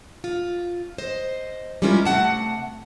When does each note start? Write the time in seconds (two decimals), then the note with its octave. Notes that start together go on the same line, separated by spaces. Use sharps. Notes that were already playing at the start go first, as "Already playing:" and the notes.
0.24 F4
0.98 C5 D#5
1.82 G3 G#3 C#4 E4 F4 A#4
2.05 C3 A3 F#5 A5